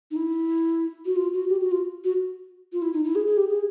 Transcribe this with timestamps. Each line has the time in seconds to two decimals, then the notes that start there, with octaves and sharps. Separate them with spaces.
0.11 D#4
0.16 E4
1.06 F#4
1.16 F4
1.33 F#4
1.49 G4
1.61 F#4
1.71 F4
2.04 F#4
2.73 F4
2.82 E4
2.93 D#4
3.04 E4
3.15 G#4
3.26 G#4
3.37 G4
3.49 G#4